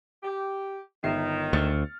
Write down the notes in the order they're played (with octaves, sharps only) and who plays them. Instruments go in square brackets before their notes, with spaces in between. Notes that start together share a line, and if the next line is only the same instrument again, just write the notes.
[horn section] G4
[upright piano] G1 E5 C7 [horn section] D#3
[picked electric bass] D2 [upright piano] F6 A6 C#7